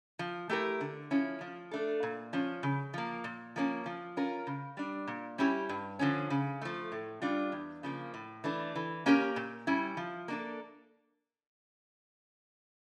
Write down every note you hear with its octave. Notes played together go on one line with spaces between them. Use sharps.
F3
A3 E4 G4 A#4
D3
F3 C#4 E4
F3
A3 D4 A4
A#2
F3 C#4
C#3
F3 A#3
A#2
F3 A#3 C#4
F3
C#4 F4 A#4
C#3
G3 D4
A#2
G3 C#4 E4 G4
G2
D3 F3 C#4
C#3
F3 A3
A2
G3 D4 F4
E2
C#3 F3 A#3
A2
E3 A3 D4
E3
A#3 C#4 G4 A#4
A#2
G3 C#4 E4
F3
A#3 D4 A4